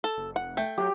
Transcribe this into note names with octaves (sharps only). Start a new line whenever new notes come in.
A4
F#1
F1 F#5
A3 G5
F#3 G4